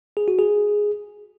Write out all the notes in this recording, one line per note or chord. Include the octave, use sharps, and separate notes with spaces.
G#4
F#4
G#4